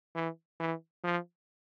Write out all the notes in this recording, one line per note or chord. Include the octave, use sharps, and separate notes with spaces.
E3
E3
F3